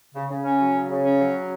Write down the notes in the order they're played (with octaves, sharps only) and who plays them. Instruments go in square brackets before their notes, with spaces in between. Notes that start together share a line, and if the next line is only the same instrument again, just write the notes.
[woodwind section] C#3
C#3
C#4
F#3
C#3
C#3
C#4
F#3